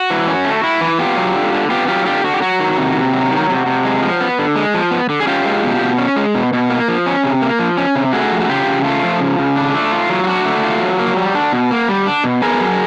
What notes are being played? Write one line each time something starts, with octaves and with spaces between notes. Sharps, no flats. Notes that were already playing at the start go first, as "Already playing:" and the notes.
Already playing: F#4
E3
C#4
A3
E4
E3
B3 F4 G4
F#3
D3
D3
B3 F4 G4
F#3 F4 G4
D3 F4 G4
D3 F#4
G4
F#3 F#4
D#3
C3
C3
F#3
D#3
C3
C3
G#3
F3
B3
D3
G#3
F3
B3
D3
G#4
C#4 F4 G4
G#3
B2
B2
C#4
G#3
B2
B2
A#3
F3
C#4
C3
A#3
F3
C#4
C3
A3 F#4 G#4
F3
F#4
C#3 F4 G4
C#3
A3 F4
F3
C#3
C#3
D4
A3
F4
F#3
F4
D4 F#4
A3
F4
F#3
A#3
G3
D4
B2
A#3
G3
D4
B2
B3 G#4 A#4
F#3